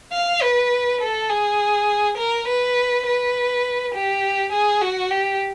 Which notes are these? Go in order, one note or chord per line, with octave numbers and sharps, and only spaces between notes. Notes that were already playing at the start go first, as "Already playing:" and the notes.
F5
B4
A4
G#4
A#4
B4
B4
G4
G#4
F#4
G4